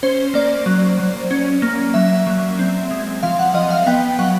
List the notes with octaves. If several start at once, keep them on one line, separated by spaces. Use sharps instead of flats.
C#4 C5
A#3 D5
F#3
F#3
C#4
A#3
F#3 E5
F#3
C4
G#3
F3 F5
F#5
F3 D#5
F5
B3 G5
F#3 F#5